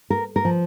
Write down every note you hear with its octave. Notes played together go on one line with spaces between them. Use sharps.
A#4
A#4
F3